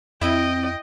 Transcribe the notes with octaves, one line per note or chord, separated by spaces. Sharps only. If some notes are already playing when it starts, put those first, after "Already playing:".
F2 C4 E4 D#5 G5 D7